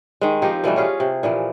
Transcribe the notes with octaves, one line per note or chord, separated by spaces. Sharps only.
D#3 G#3
F3 C4 D#4 G4
B2 E3 G3 A3
C#4 F4 G#4 F5
C3
A#2 E3 F3